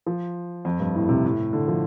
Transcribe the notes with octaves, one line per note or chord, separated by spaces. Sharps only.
F3
F2
G2
A2
C3
A2
D3
F3